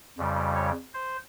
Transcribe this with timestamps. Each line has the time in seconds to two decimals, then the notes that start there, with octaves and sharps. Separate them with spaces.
0.18 F2 C#3 G3
0.55 C#5
0.94 C5